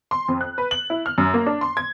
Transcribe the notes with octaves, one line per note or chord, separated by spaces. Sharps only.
C6
F2
F#6
B4
F#7
E4
F6
F#2
A#3
D4
C6
G#6